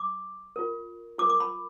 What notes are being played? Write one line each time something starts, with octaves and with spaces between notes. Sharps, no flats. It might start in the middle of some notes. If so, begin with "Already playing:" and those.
Already playing: D6
F4 A#4
F4 A#4 D6
D6
B5